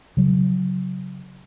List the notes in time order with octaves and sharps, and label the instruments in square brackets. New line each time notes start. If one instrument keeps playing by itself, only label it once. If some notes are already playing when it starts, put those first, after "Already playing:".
[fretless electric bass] C#3 F#3